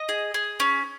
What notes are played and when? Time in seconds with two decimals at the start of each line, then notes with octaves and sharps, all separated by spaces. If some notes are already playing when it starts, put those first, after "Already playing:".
Already playing: D#5
0.09 G#4
0.34 G#4
0.60 C#4